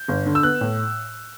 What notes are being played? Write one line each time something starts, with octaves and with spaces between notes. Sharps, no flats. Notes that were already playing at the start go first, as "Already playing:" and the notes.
Already playing: G6
G1
D3
E6
B3 F#6
A2